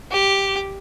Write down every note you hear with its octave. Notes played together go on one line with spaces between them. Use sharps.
G4